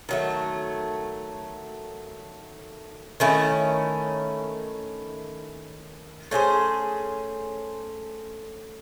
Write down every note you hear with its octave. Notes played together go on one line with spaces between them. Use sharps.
D#3 F#3 A3
D#3 A3 C#4 E4
A3 C#4 G#4 C5